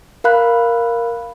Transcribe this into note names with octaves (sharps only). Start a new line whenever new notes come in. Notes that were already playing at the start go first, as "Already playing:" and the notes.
A#4 F5 B5 F#6